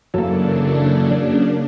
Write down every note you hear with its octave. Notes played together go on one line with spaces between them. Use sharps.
F#2 C#3 E3 F#3 A#3 D4 A4